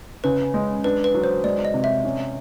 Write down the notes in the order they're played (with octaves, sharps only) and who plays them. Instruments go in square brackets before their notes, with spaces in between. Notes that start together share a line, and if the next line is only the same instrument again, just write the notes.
[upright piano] C#3 [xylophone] B4
[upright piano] G#3
[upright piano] D4 [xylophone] B4
[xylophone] B4
[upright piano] F#3
[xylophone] C5
[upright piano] G#3 [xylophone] D5
[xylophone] D#5
[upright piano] C3
[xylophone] E5
[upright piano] C#4